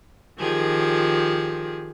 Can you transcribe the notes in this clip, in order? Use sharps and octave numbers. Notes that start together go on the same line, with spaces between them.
D#3 F3 G4 G#4